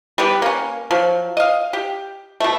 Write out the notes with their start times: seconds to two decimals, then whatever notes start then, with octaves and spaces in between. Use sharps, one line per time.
0.18 G3 B3 G4 B4
0.42 A#3 C#4
0.91 F3 F#3
1.37 D#5 F5
1.73 G4
2.40 B2 A3